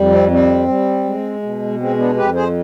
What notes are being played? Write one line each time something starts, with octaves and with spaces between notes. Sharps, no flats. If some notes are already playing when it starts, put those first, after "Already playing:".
Already playing: F2 G3
C4
G3 C4
G3
G#3
B2
G#3 C4
B3 D4
F2 G4 B4
G#4 C5